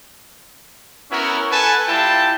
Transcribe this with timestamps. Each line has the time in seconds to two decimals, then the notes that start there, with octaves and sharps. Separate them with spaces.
1.11 B3 C#4 E4 F#4 A#4
1.52 A4 B4 F#5 G#5 A5
1.88 G3 E4 F4 G5 A5